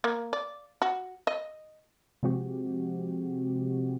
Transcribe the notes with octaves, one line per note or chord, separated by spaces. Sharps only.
A#3
D5
F#4
D#5
C3 F3 G#3 C4 F#4 G4